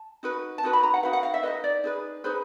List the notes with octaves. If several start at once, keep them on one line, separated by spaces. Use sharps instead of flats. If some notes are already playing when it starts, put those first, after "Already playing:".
Already playing: A5
D#4 F#4 B4
A5
D#4 F#4 B4
B5
A#5
F#5
D#4 F#4 B4 F5
F#5
F5
E5
D#4 F#4 B4 D#5
D5
D#4 G#4 B4
D#4 G#4 B4 C5